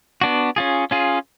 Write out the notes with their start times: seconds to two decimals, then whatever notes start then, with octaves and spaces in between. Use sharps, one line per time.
0.21 B3 D4 F#4
0.56 C#4 F4 G#4
0.91 C#4 F4 G#4